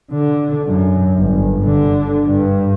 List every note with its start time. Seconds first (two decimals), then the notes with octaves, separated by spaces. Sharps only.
0.11 D3
0.67 F#2
1.19 G1
1.64 D3
2.26 G2